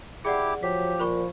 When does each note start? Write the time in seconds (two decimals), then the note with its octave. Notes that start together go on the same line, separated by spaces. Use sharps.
0.25 E4 G4 G#4 D5 F#5 D6
0.63 F3 F#3 G4 B6
1.00 A#2 C5 B5 C#6